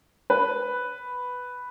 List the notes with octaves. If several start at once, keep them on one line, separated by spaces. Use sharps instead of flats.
B4